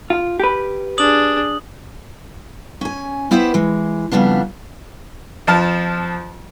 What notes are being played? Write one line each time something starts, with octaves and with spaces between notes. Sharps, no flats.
F4
G4 B4
D4 G#4 D#6 F#7
C#4 G#5
B3 E4 G4 B4 C5 E5
E3 G#3
F2 C#3 G3 B3 D4
F2 F3 A5 F6